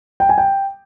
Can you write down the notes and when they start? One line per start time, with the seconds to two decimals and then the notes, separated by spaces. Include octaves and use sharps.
0.20 G5
0.29 G#5
0.38 G5